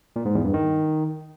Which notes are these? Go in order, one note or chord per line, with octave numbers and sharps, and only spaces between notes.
A#2
G#2
E2
G2
D#3